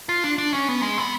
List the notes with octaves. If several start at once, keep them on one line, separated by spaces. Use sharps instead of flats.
F4
D4
D4
C#4
B3
G#3
B3